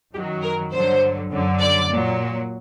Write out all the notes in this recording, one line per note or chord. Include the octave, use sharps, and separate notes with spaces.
F#2 D#3 F#3 G4
A#4
G2 D3 F#3 C5
F#2 D3 F#3
D5
A#2 F#3